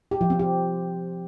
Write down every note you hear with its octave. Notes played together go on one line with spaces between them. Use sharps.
G4
F3
C4
G4